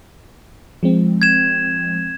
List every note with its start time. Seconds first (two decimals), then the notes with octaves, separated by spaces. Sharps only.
0.83 F3 G#3 C4
1.22 G#6 E7